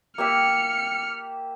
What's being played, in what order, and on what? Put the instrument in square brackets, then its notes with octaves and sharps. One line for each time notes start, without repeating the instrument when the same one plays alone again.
[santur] A#3 G4 E5 [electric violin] F6 C#7